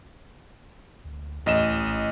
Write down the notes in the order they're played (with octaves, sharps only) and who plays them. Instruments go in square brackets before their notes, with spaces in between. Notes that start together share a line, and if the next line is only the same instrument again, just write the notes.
[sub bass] D2
[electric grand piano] A1 D#5 E7 [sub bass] D#2
[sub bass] C#2
A#1